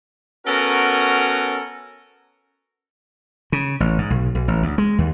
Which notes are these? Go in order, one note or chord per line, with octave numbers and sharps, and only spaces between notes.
B3 C#4 F#4 A4 A#4
C#3
A1
G#2
B1
B1
A1
D2
G#3
D#2